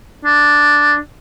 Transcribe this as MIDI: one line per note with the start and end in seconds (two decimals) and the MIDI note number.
0.25 0.96 62